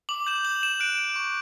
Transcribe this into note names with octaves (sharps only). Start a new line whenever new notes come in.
D6 F#7
G6 E7
G6 F#7
G6 E7
F#6 D7
F#6
C#6